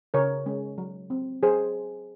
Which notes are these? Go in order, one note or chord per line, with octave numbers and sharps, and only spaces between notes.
C#3 A#4 C#5
G#3 C#4
F#3
C4
F#3 G#4 C5